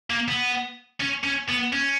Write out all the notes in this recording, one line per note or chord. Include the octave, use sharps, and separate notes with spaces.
A#3
B3
C#4
C#4
B3
C#4